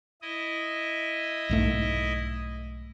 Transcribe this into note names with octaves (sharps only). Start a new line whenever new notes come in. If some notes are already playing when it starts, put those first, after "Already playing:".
E4 D#5
B1 G#2 A3